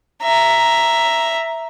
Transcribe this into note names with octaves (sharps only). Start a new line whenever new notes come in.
E5 A#5